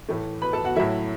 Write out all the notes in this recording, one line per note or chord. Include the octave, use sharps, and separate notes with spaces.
A2 E3 A3
B4 B5
A4 A5
F#4 F#5
A2 F#3 A3 E4 E5